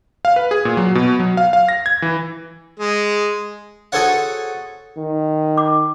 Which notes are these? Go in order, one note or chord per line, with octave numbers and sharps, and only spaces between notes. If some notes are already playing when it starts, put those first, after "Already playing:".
F5
B4
G#4
A#2
F#3
B2
F#3
F5
F5
A#6
G#6
E3
G#3
F#4 G#4 A4 C5 C#5 F#5
D#3
D6